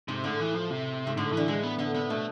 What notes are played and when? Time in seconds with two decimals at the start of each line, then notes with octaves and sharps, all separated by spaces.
0.08 G#2 C3
0.24 A2 D3
0.40 E3
0.55 F3
0.70 C3
1.07 G#2
1.17 A2 D3
1.33 D3 E3
1.48 E3 G#3
1.63 B3
1.78 D3 B3
1.95 C3 B3
2.10 B2 A3